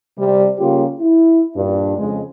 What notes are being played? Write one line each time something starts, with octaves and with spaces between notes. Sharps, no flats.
C3 G3
C#3 G3 A#3 F4 G4
E4
G2 A#2 D4
F2 C#3 G#3